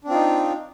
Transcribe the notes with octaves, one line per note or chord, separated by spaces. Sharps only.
C4 D4 D#4 F4